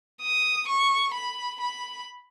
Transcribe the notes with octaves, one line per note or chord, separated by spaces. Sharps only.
D#6
C#6
B5
B5